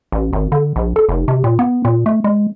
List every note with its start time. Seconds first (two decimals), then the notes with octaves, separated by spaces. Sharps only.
0.12 A1
0.33 G#1
0.52 D3
0.76 A#1
0.96 A4
1.09 F1
1.28 C3
1.44 A#2
1.59 B3
1.85 A#2
2.06 A3
2.24 G#3